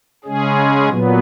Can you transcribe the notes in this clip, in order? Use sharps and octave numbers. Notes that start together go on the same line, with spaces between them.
C#3 G#3 C#4 G#4
A#2 F#3 B3